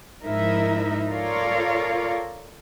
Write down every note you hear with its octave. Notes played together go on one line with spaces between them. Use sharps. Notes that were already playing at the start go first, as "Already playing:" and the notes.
G#2 F3 D#4 E4 A#4 E5
F4 A4 A#4 C#5 D5 F5